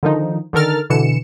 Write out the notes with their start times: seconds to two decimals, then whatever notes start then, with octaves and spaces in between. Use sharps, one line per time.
0.03 D3 D#3 F3 D#4
0.53 D3 D#3 A4 A#4 F6 A6
0.90 B2 D3 E3 C#7 E7